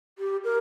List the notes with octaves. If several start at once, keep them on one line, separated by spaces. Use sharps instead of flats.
G4
A#4